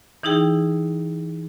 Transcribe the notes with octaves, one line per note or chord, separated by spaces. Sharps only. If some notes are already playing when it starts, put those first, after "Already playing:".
E3 D#4 E4 G#4 G5